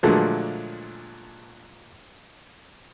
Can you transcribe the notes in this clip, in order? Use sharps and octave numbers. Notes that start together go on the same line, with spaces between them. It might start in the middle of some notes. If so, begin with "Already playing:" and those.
A#2 D3 F3 F#3 G#3 A3